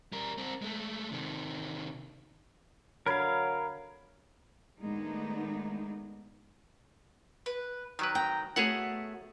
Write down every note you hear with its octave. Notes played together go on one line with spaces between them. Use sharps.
G3 A#4
C4 A#4
G#3 A3
C3 D#3
D3 F#3 A#4 F5 B5 G#6
A2 D#3 G#3 B3 D4 D#4
B4
D#3 F#3 A#4 B4
G5 A#5
A3 B3 F#4 G#4 C#5 F#5